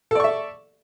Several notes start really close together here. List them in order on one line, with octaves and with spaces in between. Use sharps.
A4 D5 C#6 E5